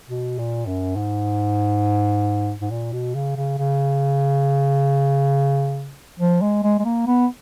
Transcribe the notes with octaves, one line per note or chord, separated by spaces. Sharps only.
B2
A#2
F#2
G#2
G#2
A#2
B2
C#3
C#3
C#3
F3
G#3
G#3
G#3
A#3
B3